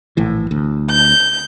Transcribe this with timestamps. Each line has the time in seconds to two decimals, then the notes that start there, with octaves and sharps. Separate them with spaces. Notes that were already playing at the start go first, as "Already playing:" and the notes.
0.17 A#1 A2 E3
0.51 D2
0.91 G6